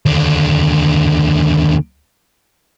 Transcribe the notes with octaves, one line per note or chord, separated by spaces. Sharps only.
D#2 D3